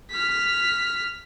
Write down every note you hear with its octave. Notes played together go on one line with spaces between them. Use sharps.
F6 B6